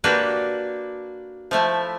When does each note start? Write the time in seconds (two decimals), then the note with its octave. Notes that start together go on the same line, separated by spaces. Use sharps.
0.04 A#3 D4 F#4 G4 B4
1.51 F3 A3 E4